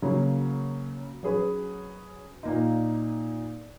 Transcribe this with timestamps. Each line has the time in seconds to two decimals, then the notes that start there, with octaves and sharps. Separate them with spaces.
0.02 C#3 F#3 A#3 C#4
1.23 F#3 C#4 G#4 B4
2.43 A#2 A#3 D#4